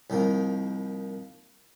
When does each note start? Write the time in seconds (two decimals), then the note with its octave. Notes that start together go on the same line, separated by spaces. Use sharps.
0.10 C2 D#3 F3 A#3